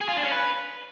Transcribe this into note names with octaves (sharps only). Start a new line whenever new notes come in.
G#4
F4
D4
C#4
B4